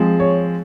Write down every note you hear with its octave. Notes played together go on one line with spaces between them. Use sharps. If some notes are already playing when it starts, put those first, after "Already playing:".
Already playing: F3 G#3 C4
C#5